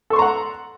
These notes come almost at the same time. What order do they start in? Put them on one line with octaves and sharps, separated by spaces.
A4 C#6 C6 A#5 F#5